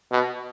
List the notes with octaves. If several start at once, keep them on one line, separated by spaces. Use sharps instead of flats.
B2